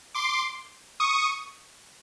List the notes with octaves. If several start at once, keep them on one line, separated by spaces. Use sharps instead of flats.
C6 D6
C#6 D#6